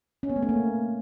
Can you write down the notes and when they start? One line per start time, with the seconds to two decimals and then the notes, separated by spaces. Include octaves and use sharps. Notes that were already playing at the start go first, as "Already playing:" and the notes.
0.23 C#4
0.30 B3
0.36 A3
0.42 C#4
0.49 A#3